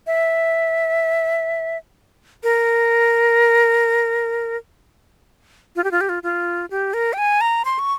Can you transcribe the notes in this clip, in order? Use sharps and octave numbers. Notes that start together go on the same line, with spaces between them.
E5
A#4
F4
G4
F4
G4
F4
F4
G4
A#4
G5
G#5
A#5
C6
C#6